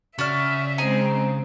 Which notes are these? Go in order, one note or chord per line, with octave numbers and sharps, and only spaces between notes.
C#3 F#4 D5 E5 F6
G#3 C4 D#4 G#4 G#5